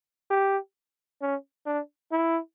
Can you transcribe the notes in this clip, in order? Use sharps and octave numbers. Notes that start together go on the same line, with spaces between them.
G4
C#4
D4
E4